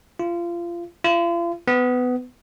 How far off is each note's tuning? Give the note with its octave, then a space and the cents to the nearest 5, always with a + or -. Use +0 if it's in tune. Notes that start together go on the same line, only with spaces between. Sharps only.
F4 -25
F4 -40
B3 +20